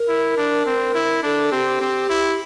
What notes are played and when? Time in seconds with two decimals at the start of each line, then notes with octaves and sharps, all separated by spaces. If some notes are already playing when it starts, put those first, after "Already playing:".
Already playing: A#4
0.08 E4
0.37 D4
0.66 C4
0.95 E4
1.23 D4 A4
1.52 C4 G4
1.81 C4
2.09 E4